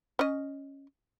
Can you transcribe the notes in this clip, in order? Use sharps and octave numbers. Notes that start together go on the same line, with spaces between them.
C#4 D#5